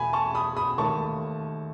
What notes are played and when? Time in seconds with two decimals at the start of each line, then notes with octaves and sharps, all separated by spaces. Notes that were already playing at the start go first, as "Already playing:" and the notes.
Already playing: E2 B2 A3 G#5 B5
0.13 A5 C#6
0.35 B5 D#6
0.57 B5 D#6
0.78 D#2 D#3 A3 A5 C#6